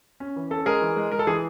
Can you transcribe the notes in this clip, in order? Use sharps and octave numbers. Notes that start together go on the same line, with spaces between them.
C#4
E3
C#4 A4
G#3 G#4 A#4
E3
G#3
G#3 A#4
A4
E3 G#4